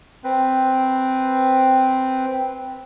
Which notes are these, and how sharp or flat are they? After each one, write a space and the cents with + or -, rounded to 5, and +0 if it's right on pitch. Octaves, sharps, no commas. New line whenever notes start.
C4 +0 B4 -5